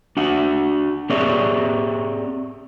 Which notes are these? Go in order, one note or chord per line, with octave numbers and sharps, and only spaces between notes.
D4 F#4 F#5
C4 G4 G#4 C#5 D5 E5